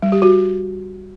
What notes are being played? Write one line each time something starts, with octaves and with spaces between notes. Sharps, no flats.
G3
G4
F#4